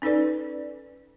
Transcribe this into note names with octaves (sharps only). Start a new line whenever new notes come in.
C#4 D#4 A4 B4 D5